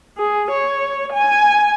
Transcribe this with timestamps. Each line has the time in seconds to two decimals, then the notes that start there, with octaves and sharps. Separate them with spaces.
0.18 G#4
0.51 C#5
1.13 G#5